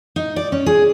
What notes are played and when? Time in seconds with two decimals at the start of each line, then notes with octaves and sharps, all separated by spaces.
0.16 D#4
0.36 D5
0.52 C#4
0.66 G#4